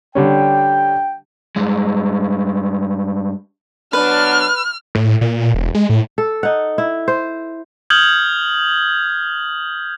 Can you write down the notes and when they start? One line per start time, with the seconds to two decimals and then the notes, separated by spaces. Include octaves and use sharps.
0.15 D3 G3 C#4 G5
1.56 G2 G#3
3.93 F#3 B3 D4 B4 F6
4.95 A2
5.21 A#2
5.54 E1
5.75 G#3
5.89 A2
6.18 A4
6.43 D#4 F#5
6.78 E4
7.08 C5
7.90 D#6 F6 G6 G#6 F#7